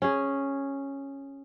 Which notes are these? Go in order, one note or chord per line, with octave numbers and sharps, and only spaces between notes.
C#4 G#4